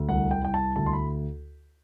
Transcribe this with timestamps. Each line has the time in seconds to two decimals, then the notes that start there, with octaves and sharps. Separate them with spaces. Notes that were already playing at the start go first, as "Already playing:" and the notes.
Already playing: D2
0.09 C2 F#5
0.31 G5
0.42 C2 G5
0.54 A5
0.76 D2 A5
0.86 C6
0.93 B5